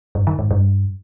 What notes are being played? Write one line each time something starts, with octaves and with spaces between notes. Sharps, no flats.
G2
D#3
G#2
G2